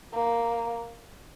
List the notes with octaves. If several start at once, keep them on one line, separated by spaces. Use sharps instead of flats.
A#3